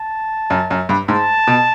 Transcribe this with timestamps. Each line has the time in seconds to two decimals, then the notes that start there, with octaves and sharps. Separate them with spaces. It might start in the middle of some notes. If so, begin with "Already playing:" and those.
Already playing: A5
0.50 F#2
0.71 F#2
0.89 G2
1.08 G#2 A5
1.47 B2